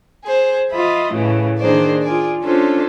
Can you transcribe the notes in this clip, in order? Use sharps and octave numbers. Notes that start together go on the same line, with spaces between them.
G#4 C5
F4 D#5 E5 B5
A2 C#3 E3 A3
D#3 A#3 D4 G#4 C5 D5
F4 G#4 D5
C#4 D4 F4 A4 C5